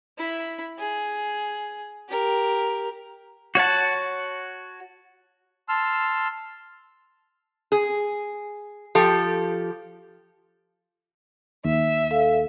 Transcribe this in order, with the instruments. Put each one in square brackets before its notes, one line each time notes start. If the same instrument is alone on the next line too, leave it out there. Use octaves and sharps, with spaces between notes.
[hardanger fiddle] E4 B5
G#4
G4 A#4
[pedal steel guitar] F#4 C#5 F#5 A5
[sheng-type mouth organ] A5 C6 E6 F6
[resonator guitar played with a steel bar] G#4
F3 G4 A4
[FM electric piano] D#2 [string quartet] E5
[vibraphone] A4 F5